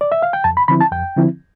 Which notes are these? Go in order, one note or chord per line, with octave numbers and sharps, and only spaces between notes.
D5
E5
F5
G5
F2 A5
B5
D3 F3 C4 E4 B5
A5
F2 G5
D3 F3 C4 E4